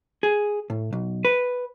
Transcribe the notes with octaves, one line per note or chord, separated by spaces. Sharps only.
G#4
A2
B1
B4